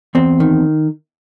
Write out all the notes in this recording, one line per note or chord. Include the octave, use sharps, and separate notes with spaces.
E2 C4
D#3